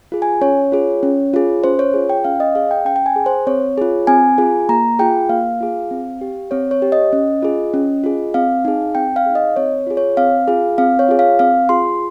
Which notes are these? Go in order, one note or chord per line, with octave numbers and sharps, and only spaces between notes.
F4 G#4
G#5
C#4 C#5
F4 G#4
C#4
F4 G#4
C#4 C5
C#5
F4 G#4
G5
C#4 F5
D#5
G#4 F5
G5
C#4 G5
G5
G#5
G#4
C5
C4 C#5
F4 G#4
C4 G#5
F4 G#4
A#3 A#5
F4 G#4 G5
A#3 F5
F4 G#4
C4
G4
C4 C#5
C#5
G4
D#5
C#4
F4 G#4
C#4
F4 G#4
C4 F5
D#4 G#4
C4 G5
F5
D#4 G#4
D#5
C4 C#5
F4 G#4
C#5
C4 F5
F4 G#4
C4 F5
C#5
F4 G#4
F5
C4 F5
F4 G#4 C6